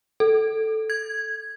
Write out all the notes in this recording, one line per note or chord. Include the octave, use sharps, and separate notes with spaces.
A4
G#6